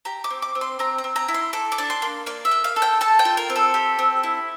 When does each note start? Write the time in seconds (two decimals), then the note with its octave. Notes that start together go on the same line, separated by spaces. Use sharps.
0.05 G4 A#5
0.24 D6
0.30 C4
0.42 D6
0.55 C4
0.61 C6
0.79 C4 A#5
0.98 A#5
1.04 C4
1.16 A#5
1.28 E4
1.34 C6
1.53 A4 D6
1.72 D6
1.78 D4
1.90 C6
2.02 A#3
2.26 A#3 D5
2.45 E5
2.51 A#3
2.64 F5
2.76 A4
2.82 G5
3.01 A4 A5
3.19 G5
3.25 F4
3.37 A#4
3.50 C4
3.56 A4
3.74 G4
3.99 C4
4.23 E4